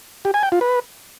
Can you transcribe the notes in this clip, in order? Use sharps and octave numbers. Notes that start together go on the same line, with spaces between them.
G4
G#5
G5
F4
B4